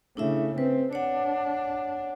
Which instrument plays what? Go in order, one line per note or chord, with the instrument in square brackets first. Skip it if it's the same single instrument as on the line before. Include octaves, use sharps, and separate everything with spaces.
[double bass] C#3 A3 [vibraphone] D4 E4 E5
[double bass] C4 [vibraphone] B4
[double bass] D4 [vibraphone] C#5 F#5